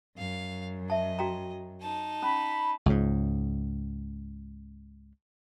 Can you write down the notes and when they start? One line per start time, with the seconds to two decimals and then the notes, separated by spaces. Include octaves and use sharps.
0.17 F#2 F5
0.90 D#5 E5 A5
1.19 F#4 G5 A#5
1.81 D#4 A5
2.22 C#4 B5
2.86 C#2 G#2